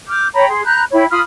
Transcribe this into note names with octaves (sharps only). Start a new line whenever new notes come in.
D6 F6 G6
C#5 G5 A#5 B5
G#4 C6
A#5 B5 F#6 G6
E4 C#5 G5 B5
F4 B5 D#6 F6